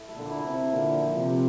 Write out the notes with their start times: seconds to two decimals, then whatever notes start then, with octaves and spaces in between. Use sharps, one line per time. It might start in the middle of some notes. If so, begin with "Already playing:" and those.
Already playing: E4 A4
0.09 A3
0.16 A#2 D3
0.30 E4
0.44 C3
0.51 E4
0.72 A#2 D3 A#3
0.94 F3
1.15 C3 F3